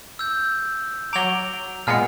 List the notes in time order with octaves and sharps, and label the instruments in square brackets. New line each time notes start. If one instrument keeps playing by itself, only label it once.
[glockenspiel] E6 G6
[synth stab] F#3 D6 [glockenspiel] A#5 F7 G7
[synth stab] A#2 G#3 B3 [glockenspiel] F6 C#7